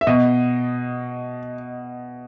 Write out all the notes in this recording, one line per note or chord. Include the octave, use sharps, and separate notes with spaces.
E5
B2 D#5